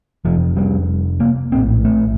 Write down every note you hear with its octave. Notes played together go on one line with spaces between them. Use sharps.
F1 F2 C3 F3
G3
A#3
A#1 A2 C4
A3